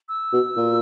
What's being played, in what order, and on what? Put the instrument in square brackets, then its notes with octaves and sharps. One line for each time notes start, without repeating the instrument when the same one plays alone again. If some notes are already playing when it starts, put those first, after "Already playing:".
[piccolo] E6
[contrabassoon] B2
A#2